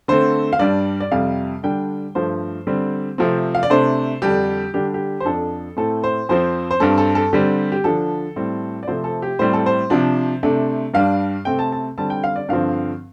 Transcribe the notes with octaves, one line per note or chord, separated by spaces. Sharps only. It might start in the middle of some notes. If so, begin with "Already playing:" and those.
D3 A3 C4 C5
F5
G2 G3 D4 D5
D5
F2 C3 G3 F5
D3 G3 D4 G5
G2 F3 A3 C5
D3 G3 C4
C3 F3 A3 C4
F5
D5
C3 A3 D4 C5
F2 D3 G3 D4 G4
D3 G3 D4 G4
G4
C5
F2 F3 D4 A4
A2 A3 C4 A4
C5
F2 F3 C4 C5
C5
G2 G3 C4 A4
A4
A4
D3 G3 C4 G4
G4
D3 F3 D4 A4
A2 G3 C4
D5
C3 F3 A3 C4 C5
A4
G4
A2 G3 C4 C5
A4
C5
C3 F3 D4
C3 A3 D4
G2 G3 D4 F5
C3 A3 C4 G5
A5
A5
D3 G3 C4 A5
G5
F5
D5
G2 D3 F3 C4 F5